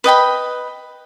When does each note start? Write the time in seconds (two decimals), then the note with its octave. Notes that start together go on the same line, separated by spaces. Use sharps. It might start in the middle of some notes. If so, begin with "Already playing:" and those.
0.04 B4 D#5 G5 B5